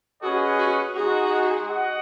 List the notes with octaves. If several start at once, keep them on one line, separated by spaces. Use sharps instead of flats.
C#4 F#4 G#4 B4 D#5 F#5
F#4
G#3 D#4 F#4 G#4
F#4 D#5 F#5